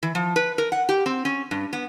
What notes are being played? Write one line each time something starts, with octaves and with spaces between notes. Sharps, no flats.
E3
F3
B4
A#4
F#5
G4
C4
C#4
G2
B3